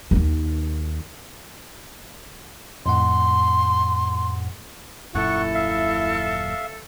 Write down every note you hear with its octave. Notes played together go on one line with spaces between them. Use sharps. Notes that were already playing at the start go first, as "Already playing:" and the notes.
D#2 D#3
F2 A2 F#5 C6
D#1 F#2 A#2 E4 A4 F#5 C#6
E5 F5